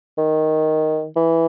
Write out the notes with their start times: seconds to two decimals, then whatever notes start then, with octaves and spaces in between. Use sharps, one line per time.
0.18 D#3
1.16 E3